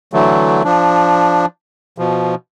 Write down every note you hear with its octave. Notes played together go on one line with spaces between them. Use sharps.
D3 E3 F#3 A3
F3 D4
B2 F3